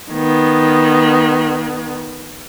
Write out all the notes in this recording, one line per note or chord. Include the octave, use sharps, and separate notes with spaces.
D#3 B3